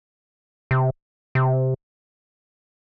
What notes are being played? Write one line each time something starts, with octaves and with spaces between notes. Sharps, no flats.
C3
C3